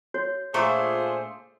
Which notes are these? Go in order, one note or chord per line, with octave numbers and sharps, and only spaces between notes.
F#4 C#5
A#2 A3 D4 F4 G#4 C5 A#5 C#6